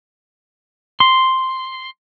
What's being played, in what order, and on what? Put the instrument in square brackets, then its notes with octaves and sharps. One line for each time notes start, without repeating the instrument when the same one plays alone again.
[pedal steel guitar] C6